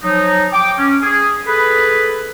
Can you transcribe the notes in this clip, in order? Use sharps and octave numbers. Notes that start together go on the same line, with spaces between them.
F3 F#3 D#4
G5 D6
C#4
G#4
G#4 A4 B4